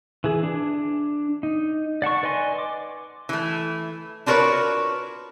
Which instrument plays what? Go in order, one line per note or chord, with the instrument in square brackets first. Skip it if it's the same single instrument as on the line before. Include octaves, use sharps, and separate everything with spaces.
[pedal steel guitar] E3 G#4
D4
D#4
D5 F#5 A5 C#6
B4 D5 D#5 G#5 C6
D6
[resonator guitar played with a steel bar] E3 A3
D4 F4 F#4 A#4 B4 C#5